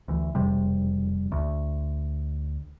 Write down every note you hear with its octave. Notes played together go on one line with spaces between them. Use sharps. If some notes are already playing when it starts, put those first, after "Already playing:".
D2 E3
E1 F2 C3 G3
D2